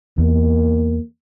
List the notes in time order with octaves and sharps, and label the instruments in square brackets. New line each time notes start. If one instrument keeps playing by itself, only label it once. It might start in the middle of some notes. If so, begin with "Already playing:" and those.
[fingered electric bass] E2 [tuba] A#3